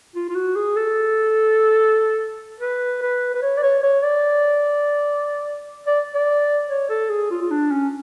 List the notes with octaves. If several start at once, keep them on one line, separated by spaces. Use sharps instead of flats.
F4
F4
F#4
G#4
A4
B4
B4
B4
C#5
D5
C#5
C#5
D5
D5
D5
C#5
A4
G#4
F4
F4
D4
C#4